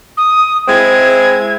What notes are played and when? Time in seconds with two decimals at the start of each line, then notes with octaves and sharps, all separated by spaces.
0.17 D#6
0.68 G#3 C4 E4 G#6